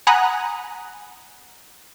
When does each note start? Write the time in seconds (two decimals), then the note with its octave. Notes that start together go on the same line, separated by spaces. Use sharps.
0.07 F#5 G#5 A#5 B5 D#6 F#6